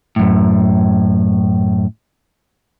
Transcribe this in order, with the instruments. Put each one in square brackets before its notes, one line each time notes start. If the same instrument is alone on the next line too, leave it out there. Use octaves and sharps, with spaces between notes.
[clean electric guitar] F#2 A2